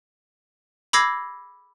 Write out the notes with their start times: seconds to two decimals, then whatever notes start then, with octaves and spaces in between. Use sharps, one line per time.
0.93 B5 D6 E6 G#6 A#6 C7